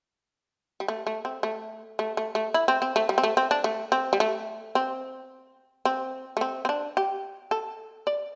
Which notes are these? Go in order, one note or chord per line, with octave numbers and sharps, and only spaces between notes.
G3
A3
A3
C4
A3
A3
A3
A3
E4
C4
C4
A3
G3
C4
A3
C4
D4
A3
C4
G3
A3
C4
C4
A3
C4
C4
D4
G4
A4
D5